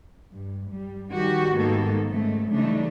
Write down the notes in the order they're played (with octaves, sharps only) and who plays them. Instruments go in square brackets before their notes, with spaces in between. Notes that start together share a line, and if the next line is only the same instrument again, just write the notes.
[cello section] G2
G3
D#3 F3 G3 F#4 G4
G#2 D#3 A#3 B3 A4
G#2 C#3 A3
C#3 E3 G3 A3 D4 D#4